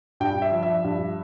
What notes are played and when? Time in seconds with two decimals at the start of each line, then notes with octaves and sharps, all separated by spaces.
0.20 G2 G5
0.42 E5
0.51 F3
0.63 E5
0.84 G2